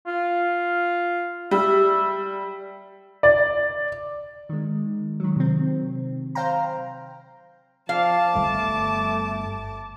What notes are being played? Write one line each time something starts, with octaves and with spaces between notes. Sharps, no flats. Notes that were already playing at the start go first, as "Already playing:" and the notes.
F4
G3 E5
D5
D#3 G#3
D#3 F#3
C3 C4
C5 F5 G5 A#5
F3 F5 A5 D6
G1 G3 A3